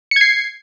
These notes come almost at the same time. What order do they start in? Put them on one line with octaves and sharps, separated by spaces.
C#7 G#6 C7